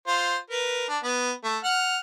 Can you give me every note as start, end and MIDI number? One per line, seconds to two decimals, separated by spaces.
0.07 0.37 65
0.07 0.37 72
0.50 0.85 70
0.50 0.85 71
0.88 0.98 62
1.04 1.31 59
1.44 1.58 57
1.64 1.98 78
1.64 1.98 89